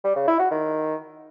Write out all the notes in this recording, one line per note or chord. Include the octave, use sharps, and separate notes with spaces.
G3
C#3
E4
F#4
D#3